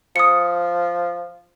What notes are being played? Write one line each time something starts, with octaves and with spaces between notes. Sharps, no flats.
F3 D#6 C#7